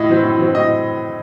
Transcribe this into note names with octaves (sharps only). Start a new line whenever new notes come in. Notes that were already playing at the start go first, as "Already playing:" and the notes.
Already playing: A2 D#5
F#3 C4
A2
F#3 C4
A2 D#5